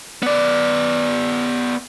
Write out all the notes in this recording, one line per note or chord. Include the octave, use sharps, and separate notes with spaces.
B3 D5